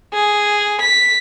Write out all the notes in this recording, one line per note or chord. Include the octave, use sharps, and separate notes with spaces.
G#4
B6